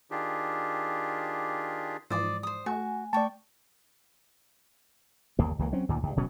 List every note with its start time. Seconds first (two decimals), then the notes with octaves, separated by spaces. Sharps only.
0.11 D#3 D4 F4 G4 G#4
2.10 G#2 E3 F3 C5 D5 D#5
2.43 C5 D#6
2.66 A3 F#4 G#5
3.13 A3 D5 G5 A5 C#6
5.39 G1 D#2 A#3
5.59 C#2 E3 A#3
5.72 F#3 C4 C#4
5.89 D2 A#2 D#3
6.03 C#2 G2
6.16 D1 B2 F#3 C#4